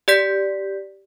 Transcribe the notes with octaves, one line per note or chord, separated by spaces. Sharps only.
G4 D5 G6 B6